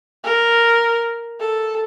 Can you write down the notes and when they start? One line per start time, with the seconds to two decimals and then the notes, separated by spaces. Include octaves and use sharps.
0.24 A#4
1.40 A4